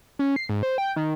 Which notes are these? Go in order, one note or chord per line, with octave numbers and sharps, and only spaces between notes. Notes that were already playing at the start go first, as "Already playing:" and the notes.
C#4
C7
G#2
C5
G5
D#3